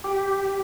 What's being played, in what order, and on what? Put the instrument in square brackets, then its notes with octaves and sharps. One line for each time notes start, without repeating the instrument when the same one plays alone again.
[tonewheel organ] G4